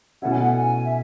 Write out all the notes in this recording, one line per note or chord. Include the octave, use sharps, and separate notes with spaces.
B2 A3 C#4 E4 F#5
G#5
F#5
G#5
E5